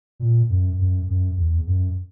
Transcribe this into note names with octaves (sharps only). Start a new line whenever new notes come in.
A#2
F#2
F#2
F#2
E2
F#2